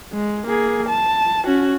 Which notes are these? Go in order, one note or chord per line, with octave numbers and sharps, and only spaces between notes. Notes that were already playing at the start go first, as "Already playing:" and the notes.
G#3
A#3 G#4
A5
C#4 F#4